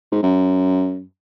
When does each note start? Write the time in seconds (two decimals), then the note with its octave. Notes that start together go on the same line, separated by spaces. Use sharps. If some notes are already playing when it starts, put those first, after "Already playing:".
0.12 G#2
0.23 F#2